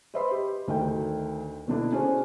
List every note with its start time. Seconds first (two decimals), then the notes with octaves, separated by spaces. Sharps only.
0.14 B4 C5 D#5 E5 B5 C6
0.31 G4
0.68 D2 D#3 D4 F#4 A4 G5
1.68 B2 D3 D4 E4
1.92 C#4 D4 F#4 G#4 C5